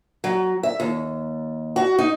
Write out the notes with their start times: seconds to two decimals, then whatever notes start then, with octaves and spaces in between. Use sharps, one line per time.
0.24 F#3
0.63 E5
0.80 D#2
1.76 F#4
1.98 D#4